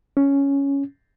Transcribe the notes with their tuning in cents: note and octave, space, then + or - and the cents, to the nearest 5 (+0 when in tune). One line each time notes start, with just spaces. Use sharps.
C#4 +5